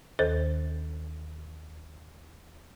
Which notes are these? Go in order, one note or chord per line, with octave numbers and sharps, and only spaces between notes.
D#2 D#3 A4 C5 A6